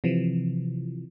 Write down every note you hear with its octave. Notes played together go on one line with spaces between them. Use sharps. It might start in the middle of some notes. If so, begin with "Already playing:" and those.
C3 E3 F3